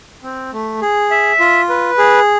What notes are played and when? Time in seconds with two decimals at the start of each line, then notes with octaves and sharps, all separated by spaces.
0.23 C4
0.53 A3
0.81 G#4
1.11 E5
1.40 F4
1.69 B4
1.98 G#4